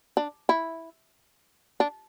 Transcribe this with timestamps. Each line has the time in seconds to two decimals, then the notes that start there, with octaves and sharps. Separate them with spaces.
0.17 D4
0.49 E4
1.80 D4